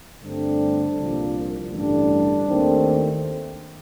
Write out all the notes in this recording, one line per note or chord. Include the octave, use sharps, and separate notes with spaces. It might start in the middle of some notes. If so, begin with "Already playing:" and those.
G2 D3 A3 C4 D4
C2 A#2 F3 A#3
A1 G2 D3 G3 D4
D#2 D#3 A3 C4